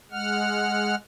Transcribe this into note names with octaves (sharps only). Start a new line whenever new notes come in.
G#3 F#5 F6